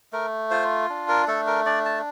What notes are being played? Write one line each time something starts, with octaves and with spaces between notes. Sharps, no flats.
A3 A#4
F4 C5
D4
A#4
A3 A4
A#4
D4 D5
A5